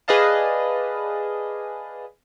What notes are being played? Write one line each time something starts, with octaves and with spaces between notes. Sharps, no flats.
G#4 B4 D5 D#5 F5 A5